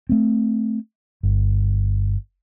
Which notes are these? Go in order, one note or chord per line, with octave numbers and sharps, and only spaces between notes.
A3 C4
G1